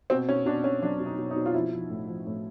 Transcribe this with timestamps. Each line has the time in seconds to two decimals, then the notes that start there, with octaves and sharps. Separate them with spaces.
0.10 B2 C4
0.28 B2 C#4
0.46 B2 D4
0.64 B2 C#4
0.82 F#3 D4
1.00 B2
1.06 D#4
1.18 B2
1.31 D#4
1.36 B2
1.46 F4
1.54 F3 E4
1.72 F3
1.90 A2
2.08 F3
2.27 A2